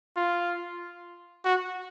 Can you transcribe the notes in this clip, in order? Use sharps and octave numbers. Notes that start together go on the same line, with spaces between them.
F4
F#4